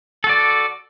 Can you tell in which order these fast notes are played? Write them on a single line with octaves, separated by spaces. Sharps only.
A4 F#4 D5